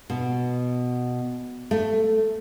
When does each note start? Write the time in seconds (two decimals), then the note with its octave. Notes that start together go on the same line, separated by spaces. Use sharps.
0.10 B2
1.71 A3